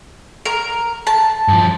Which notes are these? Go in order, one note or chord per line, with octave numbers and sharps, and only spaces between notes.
A#4
A5
G2 F3